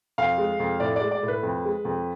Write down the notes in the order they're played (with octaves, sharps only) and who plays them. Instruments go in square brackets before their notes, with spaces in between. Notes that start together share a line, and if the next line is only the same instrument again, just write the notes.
[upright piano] F2 F5
G#3
F2
A2 D5
G#3 D5
D5
A2
B4
F2
G#3
F2